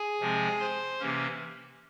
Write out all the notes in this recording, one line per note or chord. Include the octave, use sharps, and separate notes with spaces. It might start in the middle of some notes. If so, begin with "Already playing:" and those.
Already playing: G#4 G#5
C3 F3 G#3 C4
C5 C6
C3 E3 A#3 C#4